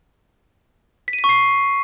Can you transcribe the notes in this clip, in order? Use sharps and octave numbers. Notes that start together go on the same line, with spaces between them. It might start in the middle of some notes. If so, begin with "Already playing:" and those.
B6
D#7
B6
C#6
C7